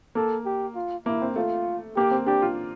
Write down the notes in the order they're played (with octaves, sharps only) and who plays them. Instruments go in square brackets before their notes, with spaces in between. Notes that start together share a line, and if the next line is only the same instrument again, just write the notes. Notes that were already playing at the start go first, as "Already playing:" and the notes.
[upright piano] A#3 [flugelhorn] A4
[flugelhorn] G4
F4
[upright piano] A#3 [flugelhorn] E4
[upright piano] C4
[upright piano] A3 [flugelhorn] F4
[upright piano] A#3 [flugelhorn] G4
[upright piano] C4
[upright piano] D4 [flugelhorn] G4
[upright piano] F4